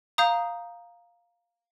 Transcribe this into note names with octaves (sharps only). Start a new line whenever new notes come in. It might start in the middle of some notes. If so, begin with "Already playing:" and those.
F5 A#5 D#6 G6